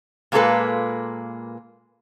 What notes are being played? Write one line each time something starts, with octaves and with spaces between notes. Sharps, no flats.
A#2 G#3 A#3 F4 A4 B4